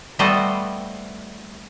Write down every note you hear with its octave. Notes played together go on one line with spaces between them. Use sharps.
G3 A3 B3 A4 C5 D#5